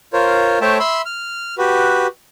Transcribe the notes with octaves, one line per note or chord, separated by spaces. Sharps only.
F4 A#4 C5 C#5
A3 C5 C#5 E5 G5 A5
E5 B5 C6 E6
F6
F#4 G4 B4